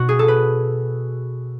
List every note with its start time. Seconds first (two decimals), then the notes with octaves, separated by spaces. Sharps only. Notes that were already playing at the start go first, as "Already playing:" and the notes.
Already playing: B2 F#4
0.09 G#4
0.19 A4
0.28 B4